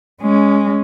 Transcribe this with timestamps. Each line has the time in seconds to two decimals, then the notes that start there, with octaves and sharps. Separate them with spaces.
0.22 G#3 C#4